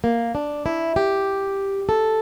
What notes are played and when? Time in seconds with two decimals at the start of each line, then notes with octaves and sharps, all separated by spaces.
0.04 A#3
0.35 D4
0.66 E4
0.96 G4
1.89 A4